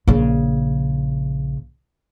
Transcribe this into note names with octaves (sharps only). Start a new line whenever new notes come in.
A#1 C#3